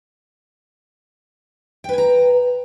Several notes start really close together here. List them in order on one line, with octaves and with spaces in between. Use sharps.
G5 B4 G#5 A#5